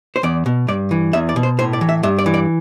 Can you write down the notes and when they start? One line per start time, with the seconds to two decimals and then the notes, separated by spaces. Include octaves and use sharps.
0.16 C5
0.23 E2 D5
0.46 B2
0.68 G2 D5
0.91 E3
1.13 E2 E5
1.29 D5
1.36 B2
1.43 C5
1.59 A2 C5
1.73 D5
1.81 E3
1.89 E5
2.03 G2 E5
2.19 D5
2.26 E3
2.34 D5